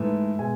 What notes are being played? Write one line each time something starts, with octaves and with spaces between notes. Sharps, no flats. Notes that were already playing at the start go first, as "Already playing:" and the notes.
Already playing: G#2 E3 A3 E5
B2 G#3 G#5